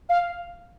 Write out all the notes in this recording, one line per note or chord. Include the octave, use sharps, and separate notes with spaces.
F5